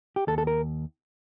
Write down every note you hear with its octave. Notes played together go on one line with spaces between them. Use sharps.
G4
D#2 A4
A4
A#4